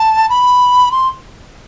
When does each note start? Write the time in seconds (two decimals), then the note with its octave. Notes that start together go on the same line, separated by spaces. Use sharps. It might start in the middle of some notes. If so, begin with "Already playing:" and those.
Already playing: A5
0.29 B5
0.92 C6